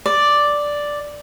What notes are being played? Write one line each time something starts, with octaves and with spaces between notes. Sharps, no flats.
D5